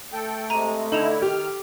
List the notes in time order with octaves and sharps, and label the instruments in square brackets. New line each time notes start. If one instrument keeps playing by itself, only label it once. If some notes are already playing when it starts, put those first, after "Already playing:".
[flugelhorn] A3 [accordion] A4 G5
[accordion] C3 G#3 [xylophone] A#5 D#7
[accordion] D3 E4 [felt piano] D#4 [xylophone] A4 E7 F7
[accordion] D#3 F6 [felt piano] G4